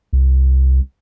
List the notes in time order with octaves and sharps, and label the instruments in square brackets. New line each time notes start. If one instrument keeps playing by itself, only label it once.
[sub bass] C2